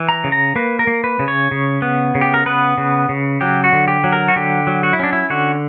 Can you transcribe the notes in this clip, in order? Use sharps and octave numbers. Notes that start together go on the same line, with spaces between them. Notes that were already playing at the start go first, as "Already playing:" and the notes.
Already playing: E3
A#5
C#3
A#5
A#3 B4
A#4
A#3
B4
C#3
C#5
C#3
B3
C#3
G4
A#4
B3 B4
C#3
C#3
F#3 G4
F#4
D3
G4
F#3
A#4
F#4
D3 G4
F#3
F#4
E4
C#4 D4
E4
D3 F#4